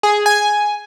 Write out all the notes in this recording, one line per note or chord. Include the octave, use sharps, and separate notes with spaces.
G#4
G#5